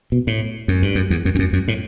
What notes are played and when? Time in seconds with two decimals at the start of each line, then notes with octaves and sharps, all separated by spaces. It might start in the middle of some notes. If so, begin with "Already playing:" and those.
0.12 B2
0.27 A2
0.68 F#2
0.82 G2
0.95 F#2
1.10 E2
1.25 F#2
1.35 E2
1.39 F#2
1.53 F#2
1.68 A2